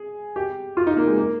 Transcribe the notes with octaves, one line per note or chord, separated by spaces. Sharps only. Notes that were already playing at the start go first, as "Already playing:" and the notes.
Already playing: G#4
G4
F4
D#4
A#3
G#3
A#3